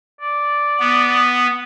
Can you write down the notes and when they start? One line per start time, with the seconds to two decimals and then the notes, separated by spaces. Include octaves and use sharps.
0.21 D5
0.80 B3